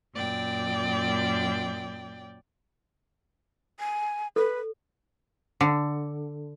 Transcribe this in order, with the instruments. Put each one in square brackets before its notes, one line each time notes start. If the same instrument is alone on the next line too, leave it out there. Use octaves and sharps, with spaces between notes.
[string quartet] F#2 A#2 D5 G5
[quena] G#5
[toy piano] A4 [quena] B4
[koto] D3